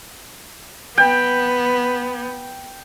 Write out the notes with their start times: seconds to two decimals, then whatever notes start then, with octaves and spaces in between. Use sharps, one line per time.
0.98 B3 G5